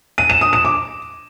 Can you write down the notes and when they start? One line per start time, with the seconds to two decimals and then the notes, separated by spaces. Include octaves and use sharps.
0.18 D#7
0.30 E7
0.41 D#6
0.53 E7
0.65 D6